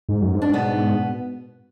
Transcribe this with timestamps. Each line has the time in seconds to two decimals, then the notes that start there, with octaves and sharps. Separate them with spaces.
0.09 G#2
0.22 F#2
0.34 G#2
0.42 D4
0.53 B2 B3